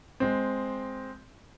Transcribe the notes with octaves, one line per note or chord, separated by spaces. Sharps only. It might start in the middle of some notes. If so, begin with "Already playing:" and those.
G#3 C4